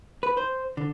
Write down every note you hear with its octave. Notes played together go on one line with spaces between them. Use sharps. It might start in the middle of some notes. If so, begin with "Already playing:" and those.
B4
C5
D3